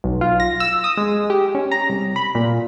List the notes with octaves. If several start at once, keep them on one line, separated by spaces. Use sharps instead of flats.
B1
F4
A#6
E6
D#6
G#3
G4
C#4
A#5
C2
B5
A#2